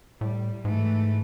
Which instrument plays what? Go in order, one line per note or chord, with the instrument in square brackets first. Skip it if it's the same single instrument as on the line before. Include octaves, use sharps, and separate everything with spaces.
[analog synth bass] A2 [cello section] G3
[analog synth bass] G#2 [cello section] E3 A3